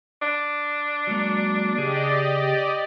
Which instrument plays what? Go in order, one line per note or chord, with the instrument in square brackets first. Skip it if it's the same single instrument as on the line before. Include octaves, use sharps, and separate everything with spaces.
[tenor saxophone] D4
[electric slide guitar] F#3 G#3 A#3
[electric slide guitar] C#3 G#4 [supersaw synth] G4 D5 D#5